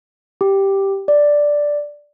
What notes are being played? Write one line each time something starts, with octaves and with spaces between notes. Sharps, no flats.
G4
D5